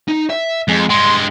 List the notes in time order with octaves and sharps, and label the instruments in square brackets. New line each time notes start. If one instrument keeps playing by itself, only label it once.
[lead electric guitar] D#4
E5
[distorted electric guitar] F2 [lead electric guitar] G#3 G#4
[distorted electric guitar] G2 G#3 [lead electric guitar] C6